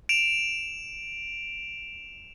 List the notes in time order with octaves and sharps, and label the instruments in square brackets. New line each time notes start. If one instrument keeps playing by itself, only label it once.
[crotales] D7 E7 F7